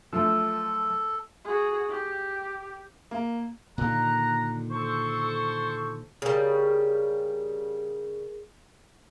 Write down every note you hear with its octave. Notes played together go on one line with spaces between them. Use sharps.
F3 F#3 A3 A4 E6
F#4 G#4
G4
A#3
A#2 D3 D#3 A#5 F#6
A4 C5 C#6
C#3 G3 G#4 A#4